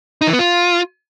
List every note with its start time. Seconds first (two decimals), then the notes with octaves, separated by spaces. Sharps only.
0.21 D#4
0.27 E3
0.33 B3
0.39 F4